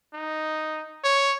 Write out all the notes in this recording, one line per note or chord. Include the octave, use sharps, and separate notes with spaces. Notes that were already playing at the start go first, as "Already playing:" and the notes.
D#4
C#5